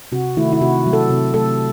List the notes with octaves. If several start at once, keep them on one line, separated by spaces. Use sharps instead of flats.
C3 F#4
D#3 A3 E4
E4
C3 F#4
F#3 A3
A4
C3
F#3 A3 A4